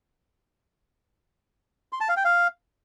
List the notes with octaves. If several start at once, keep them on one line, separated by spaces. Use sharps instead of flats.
C6
A5
F5
G5
F5